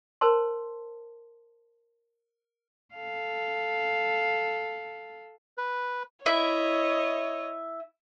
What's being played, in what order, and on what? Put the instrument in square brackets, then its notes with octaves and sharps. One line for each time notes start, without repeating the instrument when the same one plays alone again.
[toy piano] A#4 C5 A5 C6
[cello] A4 F5
[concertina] B4
[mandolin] E4 E5 [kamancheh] C#5 D#5